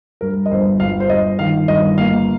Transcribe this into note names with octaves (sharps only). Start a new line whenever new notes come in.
G2 A#4
D#5
G1 C5
G1 F5
C5
G1 D#5
D#3 F5
G1 D#5
A#3 F5